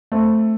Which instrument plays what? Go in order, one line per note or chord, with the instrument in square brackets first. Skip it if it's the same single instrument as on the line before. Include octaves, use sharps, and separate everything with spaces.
[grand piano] A3 C4